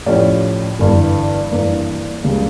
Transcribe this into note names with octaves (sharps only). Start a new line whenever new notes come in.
A2 F3 C#4 G4 D5
G1 G2 E3
G2 E3 A#3 D4
C#2 C#3 G3 A#3 D4